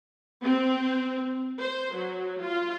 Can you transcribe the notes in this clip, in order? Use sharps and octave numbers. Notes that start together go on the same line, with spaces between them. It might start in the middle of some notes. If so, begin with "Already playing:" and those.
C4
C5
F#3
F4